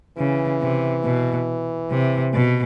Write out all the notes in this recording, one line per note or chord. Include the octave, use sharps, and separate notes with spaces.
C#3 E3
C3
B2
C3
B2